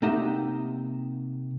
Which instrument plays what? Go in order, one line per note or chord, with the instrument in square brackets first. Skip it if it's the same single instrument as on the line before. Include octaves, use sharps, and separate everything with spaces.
[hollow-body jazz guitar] C3 A#3 D#4 G4 E5 F#5